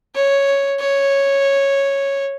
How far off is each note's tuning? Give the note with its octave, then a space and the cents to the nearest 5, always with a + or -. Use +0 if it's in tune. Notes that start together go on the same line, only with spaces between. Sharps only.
C#5 +0
C#5 -5